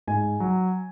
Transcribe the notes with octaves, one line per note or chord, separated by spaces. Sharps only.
G#2 G#5
F#3